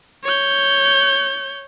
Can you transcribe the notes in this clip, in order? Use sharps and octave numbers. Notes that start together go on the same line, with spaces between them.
C#5 G6